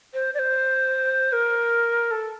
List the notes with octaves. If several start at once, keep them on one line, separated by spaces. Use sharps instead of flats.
C5
D5
C5
A#4
A4